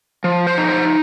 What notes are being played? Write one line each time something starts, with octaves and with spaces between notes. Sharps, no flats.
F3
C5
D#4
C5